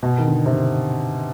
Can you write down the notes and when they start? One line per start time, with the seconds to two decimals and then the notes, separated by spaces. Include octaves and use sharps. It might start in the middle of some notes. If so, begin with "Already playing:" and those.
0.03 B2
0.18 D#3
0.28 D3
0.46 C3
0.51 D3